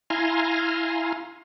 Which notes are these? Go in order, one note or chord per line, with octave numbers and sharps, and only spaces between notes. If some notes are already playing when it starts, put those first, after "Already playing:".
E4 F5 G#5 A#5 C6